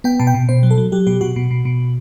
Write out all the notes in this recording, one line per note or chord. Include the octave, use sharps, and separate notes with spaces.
B3 G5
B2 A5
G5
B2
B2 C5
F#3
A4
F#3
F#3 G4
B2 G4
B2 F#4
B2
B2
B2